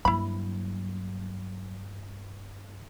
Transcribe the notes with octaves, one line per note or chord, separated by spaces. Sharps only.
G2 F#3 A#3 E4 B5